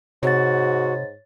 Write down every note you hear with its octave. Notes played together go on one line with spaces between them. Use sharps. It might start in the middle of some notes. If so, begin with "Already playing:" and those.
G#2 C3 F#4 C#5 A6